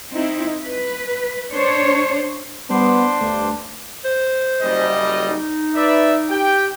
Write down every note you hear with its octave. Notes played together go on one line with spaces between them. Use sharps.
C4 D#4 E4
B4
D4 C5 C#5
G3 B3 D4 C5 C6 D6
D2 G2 A3
C5
F#1 G3 D#5
D#4
B4 D5 E5
G4 G5